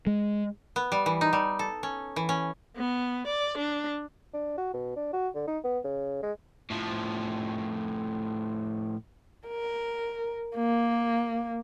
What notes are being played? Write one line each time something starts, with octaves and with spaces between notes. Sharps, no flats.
G#3
B3
G3
E3
D#4
G3
A4
C#4
E3
C#4
B3
D5
D4
D4
F#4
B2
D4
F#4
D3
D#4
B3
C#3
G#3
A2 F3
A#4
A#3